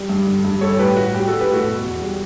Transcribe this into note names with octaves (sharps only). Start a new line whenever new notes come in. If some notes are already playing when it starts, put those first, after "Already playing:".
Already playing: G3
G2
D3
G2
G3 A4 C#5
A2 G4 B4
A2 F#4
G3 G4
G3 F#4 A4
G4 B4
A2 F#4 A4
B2
E2
G3